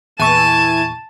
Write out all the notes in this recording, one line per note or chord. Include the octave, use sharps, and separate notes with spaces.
E2 A#2 E3 G#5 A5 C#6 D#7